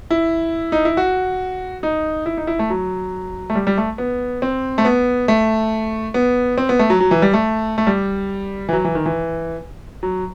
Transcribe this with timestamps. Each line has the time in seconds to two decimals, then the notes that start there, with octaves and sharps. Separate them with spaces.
0.10 E4
0.72 D#4
0.85 E4
0.97 F#4
1.83 D#4
2.26 E4
2.37 D#4
2.47 E4
2.59 A3
2.70 F#3
3.50 A3
3.55 G3
3.67 G3
3.78 A3
3.98 B3
4.42 C4
4.78 A3
4.85 B3
5.28 A3
6.14 B3
6.58 C4
6.69 B3
6.79 A3
6.90 F#3
7.00 F#3
7.11 E3
7.22 G3
7.34 A3
7.78 A3
7.87 G3
8.69 E3
8.73 F#3
8.85 E3
8.95 D#3
9.06 E3
10.03 F#3